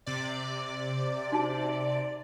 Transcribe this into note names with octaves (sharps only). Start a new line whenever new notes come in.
C3 D5
D#4 F#4 A5